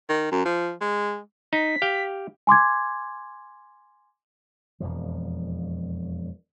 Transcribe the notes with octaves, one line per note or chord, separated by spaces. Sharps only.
D#3
F#2
F3
G#3
D#4 B6
G4 F5 G5
G#5 C6 D6 G#6
E1 F2 F3